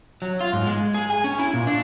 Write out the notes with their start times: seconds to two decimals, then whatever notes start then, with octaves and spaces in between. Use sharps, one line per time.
0.22 F#3
0.41 F4
0.53 G#2
0.67 G#3
0.94 G#4
1.10 G#5
1.24 C#4
1.38 E4
1.54 A#2
1.67 D4